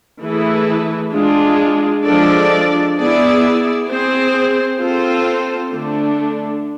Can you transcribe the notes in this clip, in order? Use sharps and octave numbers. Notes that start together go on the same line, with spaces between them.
E3 A3 E4 G#4 B4
G#3 D4 F4 G#4
F3 G#3 D4 A4 D5
B3 E4 G#4 D5
C4 G#4 C5
C4 F4 A4 C5
D3 A3 D4